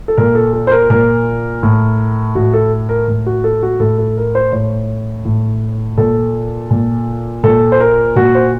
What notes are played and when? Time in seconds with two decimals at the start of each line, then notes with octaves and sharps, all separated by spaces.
0.08 A4
0.18 A#2 A#4
0.35 A4
0.53 A4
0.67 C5
0.72 A#4
0.90 A#2 A#4
1.63 A2
2.35 A2 F#4
2.54 A4
2.89 A#4
3.08 A2
3.26 F#4
3.44 A4
3.63 F#4
3.80 A2 A4
3.98 A4
4.17 A#4
4.35 C5
4.52 A2 C#5
5.25 A2
5.98 A#2 A4
6.70 A#2
7.43 A#2 A4
7.72 C5
7.80 A#4
8.16 A#2 F#4
8.35 C5